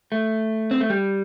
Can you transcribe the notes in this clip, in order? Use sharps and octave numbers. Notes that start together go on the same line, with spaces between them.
A3
C4
A3
G3